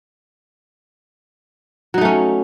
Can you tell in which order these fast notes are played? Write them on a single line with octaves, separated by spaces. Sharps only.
F#3 D#4 A3 C#4